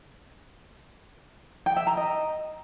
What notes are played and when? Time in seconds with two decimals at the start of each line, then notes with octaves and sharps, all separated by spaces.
1.66 G5
1.76 E5
1.87 A#5
1.97 D#5